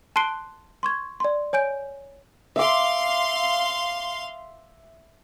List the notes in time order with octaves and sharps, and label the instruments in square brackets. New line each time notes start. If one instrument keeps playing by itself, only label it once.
[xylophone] A5 C6 F#6 C7 D7 G7
C6 C#6 G#6
D5 C6
C#5 G#5 G6 D7
[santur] E5 D6 [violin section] F5 C6